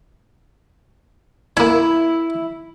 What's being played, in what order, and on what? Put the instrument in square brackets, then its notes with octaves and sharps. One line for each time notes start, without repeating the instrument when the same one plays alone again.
[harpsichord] A#3 G#5 [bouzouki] E4